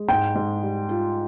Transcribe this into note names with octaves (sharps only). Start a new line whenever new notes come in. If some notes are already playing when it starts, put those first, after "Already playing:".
Already playing: G#3
G#2 G5
G#2
G3
F4